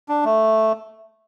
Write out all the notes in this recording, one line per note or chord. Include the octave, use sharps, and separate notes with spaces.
D4
A3